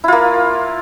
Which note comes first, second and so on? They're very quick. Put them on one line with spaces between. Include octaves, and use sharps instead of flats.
E4 F4 A#3